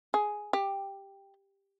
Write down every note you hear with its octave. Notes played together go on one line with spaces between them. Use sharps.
G#4
G4